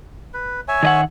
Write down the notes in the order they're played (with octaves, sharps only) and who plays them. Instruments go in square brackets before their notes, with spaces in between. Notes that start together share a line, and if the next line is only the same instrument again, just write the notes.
[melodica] B4
C#5 E5 G#5
[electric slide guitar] D#3 D#5 F#5